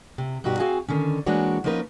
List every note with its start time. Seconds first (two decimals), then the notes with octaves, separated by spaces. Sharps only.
0.18 C3
0.44 G2 B2 D#4 F#4 G4
0.59 C4 F#4 G#4 F5 G#5
0.89 D3 D#3 C#4
1.26 E3 G#3 A#3 D4 F#4 C#5
1.64 F3 A#3 C#4 D#4 A#4 B4